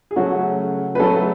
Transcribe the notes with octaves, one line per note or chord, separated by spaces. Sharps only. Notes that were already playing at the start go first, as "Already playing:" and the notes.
G#4
C#3 F#3 A3 C#4 F#4
B4
C#3 F#3 A3 C#4 A4